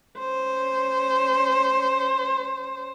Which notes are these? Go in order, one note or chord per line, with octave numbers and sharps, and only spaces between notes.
C#4 C5